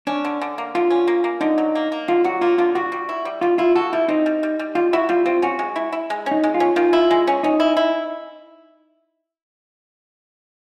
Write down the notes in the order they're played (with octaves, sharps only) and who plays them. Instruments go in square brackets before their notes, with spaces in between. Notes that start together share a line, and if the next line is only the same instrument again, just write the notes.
[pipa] C#4 [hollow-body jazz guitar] D4
[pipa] D3
D3
A#3
[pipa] D3 [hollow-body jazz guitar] F4
[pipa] C#4
A#3
A#3
[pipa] D3 [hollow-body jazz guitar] D#4
[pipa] F#3
A#3
A#3
[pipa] D3 [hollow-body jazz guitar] F4
[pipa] F#3 [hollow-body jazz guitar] F#4
[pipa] A#3 [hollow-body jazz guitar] F4
[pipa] D3 [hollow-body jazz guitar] F4
[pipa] G3 [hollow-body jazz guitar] F#4
[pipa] G3
E4
G3
[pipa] G3 [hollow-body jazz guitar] F4
[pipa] E4 [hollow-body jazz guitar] F4
[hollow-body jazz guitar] F#4 [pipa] A4
[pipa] G3 [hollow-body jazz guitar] E4
[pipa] C4 [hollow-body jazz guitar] D#4
[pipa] G3
G3
G3
[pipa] G3 [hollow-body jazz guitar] F4
[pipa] E4 [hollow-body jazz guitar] F#4
[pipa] G3 [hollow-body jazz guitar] F4
[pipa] C4 [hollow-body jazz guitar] F4
[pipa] C#4 [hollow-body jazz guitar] F#4
[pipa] G#3
E4
E4
G#3
C#4
[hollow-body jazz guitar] D#4
[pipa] G#3
[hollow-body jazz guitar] F4
[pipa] C#4
[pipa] D#3 [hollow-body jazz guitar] F4
[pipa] E4
G#3
C#4
[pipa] C#4 [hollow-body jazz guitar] D#4
[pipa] E4
E4